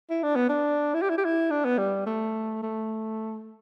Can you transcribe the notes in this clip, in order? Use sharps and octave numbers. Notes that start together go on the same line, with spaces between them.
E4
D4
B3
D4
E4
G4
E4
G4
E4
D4
B3
G3
A3
A3